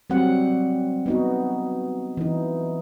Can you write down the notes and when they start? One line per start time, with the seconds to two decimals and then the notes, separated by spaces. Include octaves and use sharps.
0.10 F#3 G3 C4 F#5
1.06 B3 D#4 F#4
2.17 E3 D#4